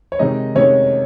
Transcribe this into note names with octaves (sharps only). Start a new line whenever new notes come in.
C#5
C3 D#3 G#3 D#4 D#5
C3 D#3 G#3 C#4 C#5